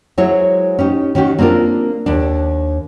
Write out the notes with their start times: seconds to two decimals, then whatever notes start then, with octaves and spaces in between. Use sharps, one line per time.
0.18 F#3 G#3 E4 C5 C#5
0.79 C#4 D#4 G4
1.15 D#3 C#4 F#4 G4
1.38 A#3 C4 D4 F4 A#4
2.06 D#2 D4